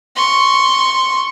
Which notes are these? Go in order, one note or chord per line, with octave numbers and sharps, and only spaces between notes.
C6 C#6